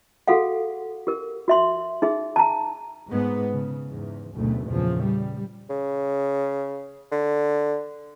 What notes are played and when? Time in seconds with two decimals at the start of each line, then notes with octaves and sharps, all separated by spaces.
0.28 F#4 G#4 A4 F5 F#5
1.07 G4 A#4
1.48 F#4 E5 C6
2.02 D#4 G#4 E5
2.36 A5 A#5
3.09 G#2 G#3 B3
3.53 C#3
3.88 E2 G#2
4.35 F#1 D2 B2 A3
4.67 E2 A#2 C#3 F3
5.03 G3
5.70 C#3
7.12 D3